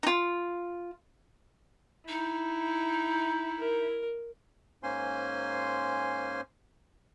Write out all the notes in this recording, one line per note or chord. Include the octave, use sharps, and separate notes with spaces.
D#4 F4
D#4 E4
A#4
G#2 A#3 C#4 C5 G#5 C6